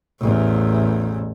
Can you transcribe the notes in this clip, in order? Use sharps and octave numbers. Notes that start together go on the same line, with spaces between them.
A1 E2